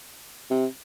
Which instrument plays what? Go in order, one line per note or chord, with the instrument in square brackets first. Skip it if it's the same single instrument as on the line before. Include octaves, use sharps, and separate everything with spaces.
[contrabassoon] C3